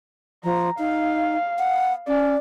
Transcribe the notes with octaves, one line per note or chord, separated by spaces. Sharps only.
F3 A#5
D#4 F5
F#5
C#4 D5